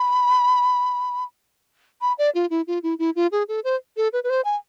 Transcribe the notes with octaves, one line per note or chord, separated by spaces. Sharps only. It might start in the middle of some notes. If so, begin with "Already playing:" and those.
Already playing: B5
B5
D5
F4
E4
F4
E4
E4
F4
G#4
A4
C5
A4
B4
B4
C5
G#5